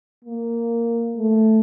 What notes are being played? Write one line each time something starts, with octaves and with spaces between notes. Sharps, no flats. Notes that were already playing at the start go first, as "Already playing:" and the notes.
A#3
A3